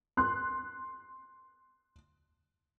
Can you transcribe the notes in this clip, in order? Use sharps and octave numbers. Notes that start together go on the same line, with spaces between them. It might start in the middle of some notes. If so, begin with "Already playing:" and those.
C6 F#6